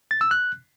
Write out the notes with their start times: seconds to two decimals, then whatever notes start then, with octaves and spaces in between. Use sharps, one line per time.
0.11 A6
0.21 E6
0.31 F#6